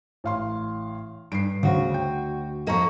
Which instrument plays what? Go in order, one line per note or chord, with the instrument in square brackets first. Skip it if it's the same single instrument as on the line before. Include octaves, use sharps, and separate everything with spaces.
[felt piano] A1 F5 C6
[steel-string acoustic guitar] G2 [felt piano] C7 D7
[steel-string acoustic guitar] D2 F#4 [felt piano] C#3 C5
[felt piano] G5
[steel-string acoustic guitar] F2 A#3 [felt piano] D#5 A#5 C#6